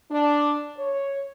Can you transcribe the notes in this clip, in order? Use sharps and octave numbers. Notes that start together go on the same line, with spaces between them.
D4
C#5